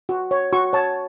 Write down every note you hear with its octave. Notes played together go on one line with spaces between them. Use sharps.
F#4
C#5
F#4 C#6
C#5 A5